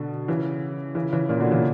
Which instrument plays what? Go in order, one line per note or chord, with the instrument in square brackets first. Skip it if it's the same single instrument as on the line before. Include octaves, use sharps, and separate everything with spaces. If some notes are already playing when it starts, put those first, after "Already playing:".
Already playing: [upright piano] B2 D3
C#3 E3
C#3 E3
C#3 E3
A#2 C#3
B2 D3
C#3 E3